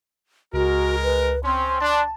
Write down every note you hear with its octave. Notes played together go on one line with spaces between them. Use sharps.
C#2 G#3 F#4 A#4
B4
C4 C#4 C6
D4 A5